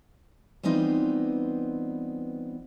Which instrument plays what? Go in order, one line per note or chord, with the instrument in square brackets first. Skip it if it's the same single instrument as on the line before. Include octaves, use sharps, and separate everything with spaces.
[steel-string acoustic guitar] E3 G3 B3 C4 D#4 F4